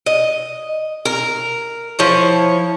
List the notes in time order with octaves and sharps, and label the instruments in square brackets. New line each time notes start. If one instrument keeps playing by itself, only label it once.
[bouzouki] D#5
A#4
F3 E4 C#5